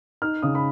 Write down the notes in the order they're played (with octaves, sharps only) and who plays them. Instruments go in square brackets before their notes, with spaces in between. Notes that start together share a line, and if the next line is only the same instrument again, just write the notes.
[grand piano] D#4 F6
C#3 D#6
B5